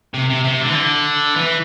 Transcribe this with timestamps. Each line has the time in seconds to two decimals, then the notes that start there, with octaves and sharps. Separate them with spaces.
0.14 C3
0.30 C3
0.44 C3
0.60 D3
0.69 E3
0.75 D3
1.36 E3